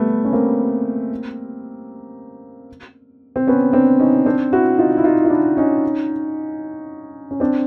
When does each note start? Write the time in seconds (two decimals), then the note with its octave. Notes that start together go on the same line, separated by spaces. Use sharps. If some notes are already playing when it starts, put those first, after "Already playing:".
Already playing: G3 A3 B3
0.25 C#4
0.33 A#3 C4
3.36 C4
3.47 B3 C#4
3.73 C4 D4
3.99 C#4 D#4
4.26 C4 D4
4.53 E4 F#4
4.78 D#4 F4
4.97 E4
5.04 D#4 F4
5.25 F4
5.30 D4 E4
5.57 C#4 D#4
7.31 C#4
7.40 C4 D4